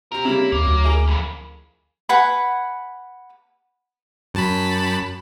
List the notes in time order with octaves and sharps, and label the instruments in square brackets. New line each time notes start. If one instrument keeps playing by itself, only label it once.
[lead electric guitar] C2 A#4 [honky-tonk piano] C3 C4
[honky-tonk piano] C#3 G3 A#3 [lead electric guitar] E4
[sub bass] D#2 [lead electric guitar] A#3
[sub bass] D2 [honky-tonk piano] F#3
[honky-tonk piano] E4 G#4 A#4
[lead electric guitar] B1 F2
[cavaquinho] B4 F#5 G#5 B5
[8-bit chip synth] F#2 A5 B5